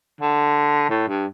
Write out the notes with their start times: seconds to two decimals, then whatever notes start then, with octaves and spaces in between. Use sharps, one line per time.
0.21 D3
0.90 A2
1.08 G2